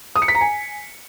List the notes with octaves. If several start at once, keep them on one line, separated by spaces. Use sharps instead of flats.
D#6
C#7
B6
A#5
G#5